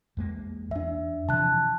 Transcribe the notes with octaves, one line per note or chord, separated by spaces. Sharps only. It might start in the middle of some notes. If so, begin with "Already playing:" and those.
E2 G#3 A#3
E2 D4 E5
C3 E3 F3 A5 F#6